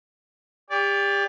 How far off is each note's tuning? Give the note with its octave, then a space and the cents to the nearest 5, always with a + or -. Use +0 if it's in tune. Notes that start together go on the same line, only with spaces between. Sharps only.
G4 +35 D5 -20